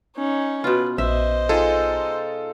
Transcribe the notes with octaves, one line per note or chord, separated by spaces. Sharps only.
C#4 D#4
B2 F4 B4
A#1 C5 D#5 E5
D#4 F4 G#4 A4